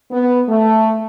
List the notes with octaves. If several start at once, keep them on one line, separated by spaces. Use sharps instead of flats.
B3
A3